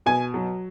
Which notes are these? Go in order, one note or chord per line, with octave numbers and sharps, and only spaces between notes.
B2 G#5
F#3